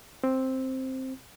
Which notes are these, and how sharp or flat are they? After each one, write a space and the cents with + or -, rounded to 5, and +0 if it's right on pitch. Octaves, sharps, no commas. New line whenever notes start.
C4 +5